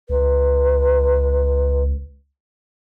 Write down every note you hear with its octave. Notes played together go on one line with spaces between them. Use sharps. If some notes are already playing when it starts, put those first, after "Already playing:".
C#2 B4